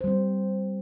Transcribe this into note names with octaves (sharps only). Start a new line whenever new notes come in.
G3 C4 C5